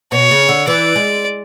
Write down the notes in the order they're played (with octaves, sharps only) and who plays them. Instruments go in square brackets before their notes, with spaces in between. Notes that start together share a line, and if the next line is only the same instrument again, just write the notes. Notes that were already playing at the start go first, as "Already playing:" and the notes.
[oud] B2 [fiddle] C#5
[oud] C#3
D3
[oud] E3 [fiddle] D5
[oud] G#3